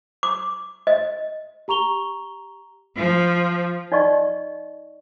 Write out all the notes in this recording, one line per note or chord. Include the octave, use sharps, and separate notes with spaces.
D6
D#5
G4 A#5 C#6 F7 G7
F3
D#4 D5 D#5 C#6